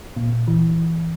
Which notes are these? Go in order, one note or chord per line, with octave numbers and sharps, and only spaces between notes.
A#2
E3